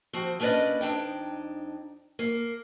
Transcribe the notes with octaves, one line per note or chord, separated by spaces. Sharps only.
F3 C4 F#4
A#3 C#4 D4 B4 D5 D#5
F2 D4 D#4 G5
A#3